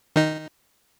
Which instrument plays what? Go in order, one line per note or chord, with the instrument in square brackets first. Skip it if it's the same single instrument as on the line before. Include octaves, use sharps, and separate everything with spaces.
[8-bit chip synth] D#3 D#4